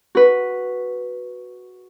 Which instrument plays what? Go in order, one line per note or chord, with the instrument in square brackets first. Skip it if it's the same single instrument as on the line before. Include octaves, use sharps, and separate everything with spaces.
[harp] F#4 B4